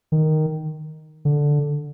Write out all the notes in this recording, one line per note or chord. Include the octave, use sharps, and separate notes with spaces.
D#3
D3